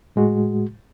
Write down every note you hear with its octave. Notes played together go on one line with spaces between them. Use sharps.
A2 G#3 F#4